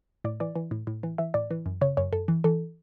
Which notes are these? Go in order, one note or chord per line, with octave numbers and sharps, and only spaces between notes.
A2 D5
E3 D5
E3
A2
A2
E3
E3 E5
A2 D5
E3
F#2
C#3 C#5
F#2 C#5
F#2 A4
E3
E3 A4